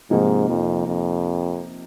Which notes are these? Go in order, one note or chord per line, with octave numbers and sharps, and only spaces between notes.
G#2 C3 F3 A#3 D#4
F2
F2